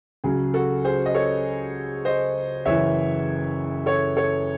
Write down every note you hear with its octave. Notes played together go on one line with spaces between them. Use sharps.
C#2 C#3 F#3 G#4
F#4 A4
G#4 C5
D#5
A4 C#5
C5 D#5
F#1 F#2 E3 C#5 E5
A4 C#5
A4 C#5